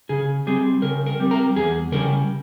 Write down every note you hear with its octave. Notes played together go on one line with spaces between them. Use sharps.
C#3 G#4
G3 C4 G#4
C#3 A#4
A#4
G3 C4
A#4
E2 G#4
C#3 G3 C#4 A#4